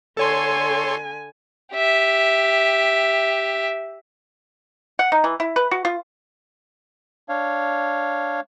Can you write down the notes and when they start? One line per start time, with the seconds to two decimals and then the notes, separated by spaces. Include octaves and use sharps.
0.17 D3 A4 C#5 G#5 C6
1.73 G4 E5
4.99 F#5
5.12 D#4
5.24 E3
5.40 E4
5.56 B4
5.71 F#4
5.85 F4
7.29 D4 C#5 F5